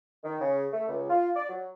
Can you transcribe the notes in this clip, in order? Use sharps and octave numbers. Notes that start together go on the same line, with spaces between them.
D#3
C#3
A3
C#2
F4
D5
F#3